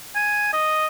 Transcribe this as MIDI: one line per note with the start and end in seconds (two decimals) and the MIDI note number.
0.16 0.50 80
0.53 0.87 75